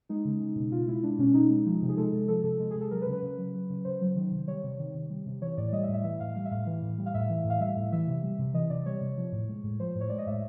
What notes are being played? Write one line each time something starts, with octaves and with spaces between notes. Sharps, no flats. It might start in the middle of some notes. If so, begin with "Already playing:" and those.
G#3 D#4
C#3
G#3
B2
B2 F4
G#3 E4
G#3 D4
B2 C#4
B2 D#4
G#3
F3
C3
G#4
G#3 A4
C3
F3 A4
C3 A4
G#3
C3 G#4
A4
F#3 A#4
B4
C#3
B4
C#3
F#3
F#3
C#3
C#3 C5
F#3
D#3
C3
G3 C#5
C3
D#3
C3
G3
C3
E3 C#5
A2 D5
G3 D#5
E5
A2
E5
E3 E5
A2 F5
G3 F5
E5
A2 F5
E3
A2
G3
F5
A2 E5
E3
A2
F5
G3 E5
A2
E3 E5
C3
G3
C3
E3 D#5
C3 D5
G3 C#5
C3
F3
A2
G#3
A2
F3 C5
A2
C#5
G#3 D5
D#5
A2 E5